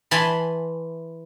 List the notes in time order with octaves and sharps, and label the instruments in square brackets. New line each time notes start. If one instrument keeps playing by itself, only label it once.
[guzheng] E3 G#5 A5 B5 C6